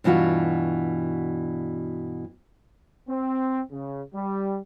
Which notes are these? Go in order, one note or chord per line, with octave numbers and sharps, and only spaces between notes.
G2 B2 E3 F4 F#4
C4
C#3
G3